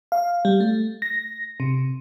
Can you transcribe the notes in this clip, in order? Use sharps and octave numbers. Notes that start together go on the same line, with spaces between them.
F5
G3
A3
A#6
C3